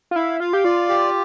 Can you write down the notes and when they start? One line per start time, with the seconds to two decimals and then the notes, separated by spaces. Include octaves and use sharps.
0.11 F4
0.16 E4 F5
0.40 F4 F5
0.53 G4
0.65 F4 D5
0.89 G4